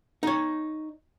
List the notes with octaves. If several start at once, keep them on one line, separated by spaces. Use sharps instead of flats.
D#4 C#5